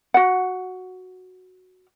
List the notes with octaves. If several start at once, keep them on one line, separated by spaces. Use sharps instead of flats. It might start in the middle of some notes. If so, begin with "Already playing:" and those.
F#4 F#5